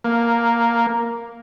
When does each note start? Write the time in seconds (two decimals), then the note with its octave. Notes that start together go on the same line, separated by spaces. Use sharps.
0.04 A#3